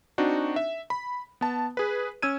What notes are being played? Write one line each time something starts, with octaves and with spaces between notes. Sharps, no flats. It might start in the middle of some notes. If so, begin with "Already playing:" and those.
C4 D4 D#4 F#4
E5
B5
B3 A5
G#4 B4
C#4 E6 G#6 D#7